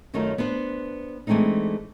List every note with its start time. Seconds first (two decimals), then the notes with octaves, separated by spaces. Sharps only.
0.13 F#2 D#3 F#3 A3 D#4 F4
0.38 B3 D4 B4 C5
1.27 E3 G#3 A3 C4 D4 D#4